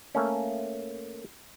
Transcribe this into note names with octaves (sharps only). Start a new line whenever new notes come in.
A3 A#3 C#4